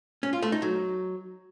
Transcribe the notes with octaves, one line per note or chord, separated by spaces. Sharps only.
C#4
F4
A3
D#4
F#3